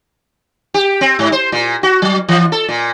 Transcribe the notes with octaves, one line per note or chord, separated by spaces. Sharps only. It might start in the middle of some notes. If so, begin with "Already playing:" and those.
G4
C4
G#2
C5
A#2
F#4
F#3
E3
A4
A#2